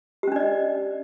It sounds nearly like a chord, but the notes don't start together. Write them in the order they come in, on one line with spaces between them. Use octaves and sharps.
G4 C#4 D4 D5 D#5